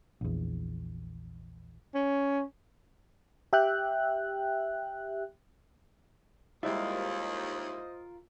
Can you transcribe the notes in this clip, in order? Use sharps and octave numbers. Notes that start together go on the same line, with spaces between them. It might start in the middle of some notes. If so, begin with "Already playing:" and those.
A#1 E2
C#4
G4 E5 G5 F#6
D#2 G3 G#3 E4 F4 A#4 C5 D#5